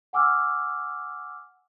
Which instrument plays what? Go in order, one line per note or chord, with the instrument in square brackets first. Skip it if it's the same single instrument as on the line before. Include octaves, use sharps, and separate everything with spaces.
[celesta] F#5 G#5 D6 E6 F6